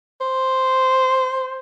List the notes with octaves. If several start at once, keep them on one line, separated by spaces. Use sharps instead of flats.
C5